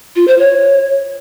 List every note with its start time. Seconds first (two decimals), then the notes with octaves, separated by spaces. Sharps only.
0.16 F4
0.28 C5
0.40 C#5